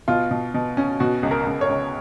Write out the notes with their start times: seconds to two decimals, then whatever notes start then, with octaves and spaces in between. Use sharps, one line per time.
0.08 B2 F4
0.31 B2
0.54 B2
0.77 C#4
1.00 B2 F#4
1.23 C#2
1.31 A#4
1.47 C#2
1.61 C#5
1.69 C#2